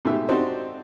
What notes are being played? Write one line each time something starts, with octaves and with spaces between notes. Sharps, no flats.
G#2 B2 A3 G4 E5
C4 D4 D#4 F#4 G4 C5